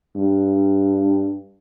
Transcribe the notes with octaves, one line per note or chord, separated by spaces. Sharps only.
G2